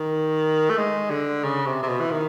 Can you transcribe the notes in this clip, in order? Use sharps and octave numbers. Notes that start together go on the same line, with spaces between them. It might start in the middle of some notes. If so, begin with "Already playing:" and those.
Already playing: D#3
A3
G#3
D3
C#3
C3
C3
B2
E3
D#3